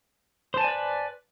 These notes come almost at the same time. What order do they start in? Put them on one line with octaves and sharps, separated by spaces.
C5 A5 G#5 D5 B4